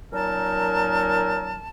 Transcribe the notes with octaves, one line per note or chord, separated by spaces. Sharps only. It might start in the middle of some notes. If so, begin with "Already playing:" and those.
A#2 F#3 C#4 D#4 A#4 A5